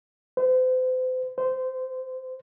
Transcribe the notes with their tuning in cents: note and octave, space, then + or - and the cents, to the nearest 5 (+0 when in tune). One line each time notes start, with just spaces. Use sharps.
C5 -40
C5 -20